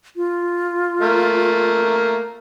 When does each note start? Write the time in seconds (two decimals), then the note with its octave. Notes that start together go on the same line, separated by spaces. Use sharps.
0.16 F4
1.01 A3 A#3